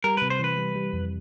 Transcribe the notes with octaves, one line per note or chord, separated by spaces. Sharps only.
G3 A#4
C3 B4
C5
E3 B4
G3
G3
F2